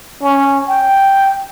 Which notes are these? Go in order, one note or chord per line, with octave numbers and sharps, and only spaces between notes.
C#4
G5